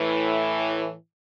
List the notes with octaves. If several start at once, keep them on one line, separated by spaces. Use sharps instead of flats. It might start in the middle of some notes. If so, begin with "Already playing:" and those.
Already playing: A2 E3